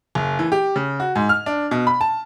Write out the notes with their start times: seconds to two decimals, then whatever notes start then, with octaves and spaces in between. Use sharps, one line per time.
0.15 F#1
0.39 E3
0.52 G4
0.76 C#3
1.00 F#4
1.16 G#2
1.29 F6
1.46 D4
1.71 B2
1.87 B5
2.01 A5